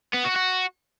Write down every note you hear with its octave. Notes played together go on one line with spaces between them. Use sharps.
B3
F#4
F#4